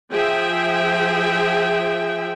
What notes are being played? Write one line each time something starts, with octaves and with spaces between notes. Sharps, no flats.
F3 G#4 E5 G5